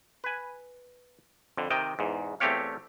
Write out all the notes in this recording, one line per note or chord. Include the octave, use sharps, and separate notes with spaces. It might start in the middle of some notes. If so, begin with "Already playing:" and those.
B4 G#5
F2 D3
C3 D#3 D#5 G5
E2 G#2
E2 A3 C4 G4 C#5 F5